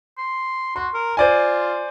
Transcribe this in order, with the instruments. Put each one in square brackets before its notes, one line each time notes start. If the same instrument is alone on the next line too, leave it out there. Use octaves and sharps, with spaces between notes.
[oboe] C6
[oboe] F#4 [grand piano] C6
[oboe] A#4
[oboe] F4 [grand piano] C5 D5 G#5